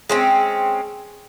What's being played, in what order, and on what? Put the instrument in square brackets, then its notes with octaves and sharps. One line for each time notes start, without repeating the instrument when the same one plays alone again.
[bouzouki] G#3 C4 C#4